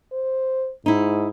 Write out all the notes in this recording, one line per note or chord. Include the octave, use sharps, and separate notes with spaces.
C5
G#2 D#4 E4